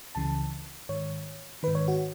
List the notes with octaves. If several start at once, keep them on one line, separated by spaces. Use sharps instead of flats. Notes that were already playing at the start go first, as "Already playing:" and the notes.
C#2 C#3 E3 A5
G#2 D#3 C#5
G#2 D#3 B4
C#5
F#4